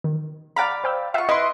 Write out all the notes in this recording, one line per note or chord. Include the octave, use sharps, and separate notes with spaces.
D#3
D5 F5 F#5 A#5 B5
C5 G5 E6
F4 E5 F#5 C#6
E4 B4 D#5 C6